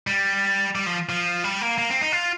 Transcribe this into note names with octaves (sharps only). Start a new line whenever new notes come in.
G3
G3
F3
F3
G3
A#3
A#3
C4
D#4
F4